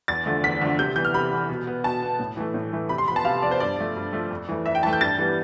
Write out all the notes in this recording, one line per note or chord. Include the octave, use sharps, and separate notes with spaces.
E2 A6
D3 F3 A3
E2 B6
D3 F3 A3
C3 G6
E3 B3 G6
F6
C3 B5
E3 B3
B2
B3
B2 A5
B3
A2
E3 A3
A2
E3 A3
C3 B5
C6
F3 B3 A5 B5
C3 F5
F3 B3 D5
C5
G2 D5
F3 A3
G2
F3 A3
F2
E3 A3
F2 E5
G5
E3 A3 A5
G6
G2 A6
E3 G3 B3